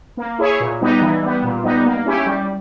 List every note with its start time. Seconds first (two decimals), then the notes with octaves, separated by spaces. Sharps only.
0.17 A#3
0.38 E4 G#4 C#5
0.60 A#2
0.81 G3 B3 D#4
1.01 E3
1.22 G3 B3
1.43 A#2
1.63 G3 B3 D#4
1.85 A#3
2.06 C#4 E4 G4
2.26 G3